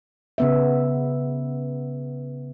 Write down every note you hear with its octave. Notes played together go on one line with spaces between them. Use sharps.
C#3 B3 E5